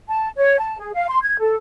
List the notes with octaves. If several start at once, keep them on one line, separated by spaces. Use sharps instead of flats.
A5
C#5
A5
G#4
F5
C6
G#6
A4